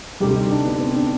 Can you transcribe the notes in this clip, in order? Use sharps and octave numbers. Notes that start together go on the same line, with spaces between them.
D2 C3 G3 G4
D#4
D4
B3
C4
D4